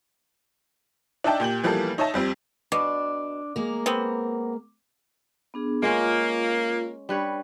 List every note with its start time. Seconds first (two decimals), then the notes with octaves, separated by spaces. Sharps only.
1.24 D4 D#4 D5 E5 G5 A5
1.40 A#2 G4 G6 F#7
1.64 E3 F3 G3 A#3 B3 A4
1.98 D#4 C#5 D#5 E5 A5
2.14 F2 G3 C4
2.72 B2 D4 D6
3.56 G#3 A#3 A#4
3.86 B3 C4
5.54 B3 D4 G#4
5.82 G#3 A#3 C#4 F4
7.09 G3 D4 B4 C#5